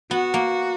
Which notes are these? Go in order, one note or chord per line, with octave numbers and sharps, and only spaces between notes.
B3 F#4
A#3